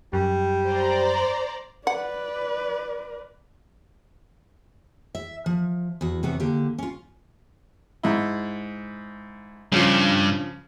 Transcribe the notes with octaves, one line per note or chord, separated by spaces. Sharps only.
F#2 G3
C5 D5 A#5
B4 D5 F#5
E5
F3
E2 F#4
E2 C3 B3 C#5 F#5
D3 A#3 G4
C#4 F4
G#2 E4
G2 C#3 F3